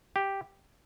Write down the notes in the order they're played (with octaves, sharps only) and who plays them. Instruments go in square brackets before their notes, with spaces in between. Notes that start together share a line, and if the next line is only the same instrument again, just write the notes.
[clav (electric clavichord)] G4